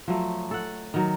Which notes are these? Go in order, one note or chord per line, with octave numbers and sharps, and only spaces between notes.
F3 F#3 A3
A4 F#5
D#3 F#3